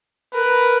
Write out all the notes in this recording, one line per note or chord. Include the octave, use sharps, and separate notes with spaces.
A#4 B4